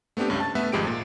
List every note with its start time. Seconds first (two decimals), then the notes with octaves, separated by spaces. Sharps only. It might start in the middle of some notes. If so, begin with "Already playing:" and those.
0.17 A3 B3 C4 D4 G4
0.28 C#2 G2 C#4
0.40 A5 A6
0.55 A3 B3 A4 B4 E5 F#5
0.72 G#1 F2 G#3 G4 D7
0.87 A#2